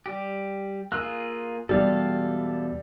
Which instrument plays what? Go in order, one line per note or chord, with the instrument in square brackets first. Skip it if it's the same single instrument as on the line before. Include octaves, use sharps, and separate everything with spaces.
[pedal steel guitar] G3 G4
[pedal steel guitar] A#3 F4 G#4 [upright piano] E6 F#6
[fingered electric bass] E2 B2 [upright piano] G3 G4 D5 [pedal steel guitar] A4 F5